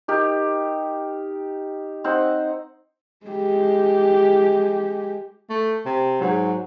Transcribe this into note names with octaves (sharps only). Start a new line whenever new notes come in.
D#4 G4 A#4
C4 D#4 C5 F#5
G#3 G4
A3
C3
G#2 F#3